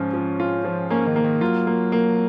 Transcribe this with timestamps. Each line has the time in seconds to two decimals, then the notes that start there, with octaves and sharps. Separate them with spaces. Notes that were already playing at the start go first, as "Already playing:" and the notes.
Already playing: G#2 F3 C#4 F4
0.14 F3
0.40 F4
0.65 F3
0.90 A#3 C#4
1.07 D#3
1.16 A#3
1.24 D#3
1.41 F#3 F4
1.67 A#3
1.92 A#3